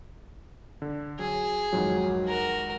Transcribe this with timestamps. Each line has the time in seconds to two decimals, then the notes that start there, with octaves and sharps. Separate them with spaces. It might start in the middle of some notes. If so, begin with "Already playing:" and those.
0.82 D3
1.19 F#3 G#4
1.73 F2 G#2 D#3 F#3
2.26 F#4 A#4